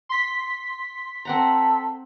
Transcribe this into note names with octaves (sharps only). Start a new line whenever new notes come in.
C6 B6
C4 A4 F#5 A#5